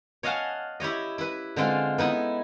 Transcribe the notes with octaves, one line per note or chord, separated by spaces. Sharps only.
C#5 D#5 F5 F#5 G#5 A5
E4 G4 C#5 D#5
E4 B4
D3 G#3 C4 F4
B3 D#4 E4